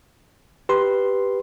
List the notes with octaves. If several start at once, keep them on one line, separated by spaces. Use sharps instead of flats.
G4 B4 C6